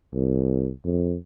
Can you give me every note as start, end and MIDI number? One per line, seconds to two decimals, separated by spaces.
0.14 0.70 36
0.85 1.16 41